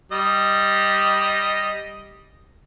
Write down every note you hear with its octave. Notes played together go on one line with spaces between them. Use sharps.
G3 D#5